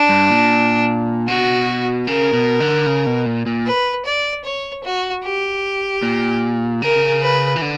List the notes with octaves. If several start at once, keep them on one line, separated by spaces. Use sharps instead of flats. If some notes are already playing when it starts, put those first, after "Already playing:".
Already playing: D4
G2
A#2
B2 F#4
C#3 A#4
B2
D3
C#3
B2
A#2
A#2
B4
D5
C#5
F#4
G4
A#2
C#3 A#4
B4
E3
D3